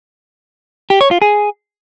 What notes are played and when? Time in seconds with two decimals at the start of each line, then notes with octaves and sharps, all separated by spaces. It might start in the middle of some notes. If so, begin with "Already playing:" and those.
0.90 G4
1.01 C#5
1.11 F4
1.22 G#4